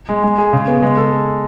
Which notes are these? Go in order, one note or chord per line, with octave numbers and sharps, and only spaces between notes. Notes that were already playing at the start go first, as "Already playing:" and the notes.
G#3
G#3
G#4
C#3
B3
G#3
A4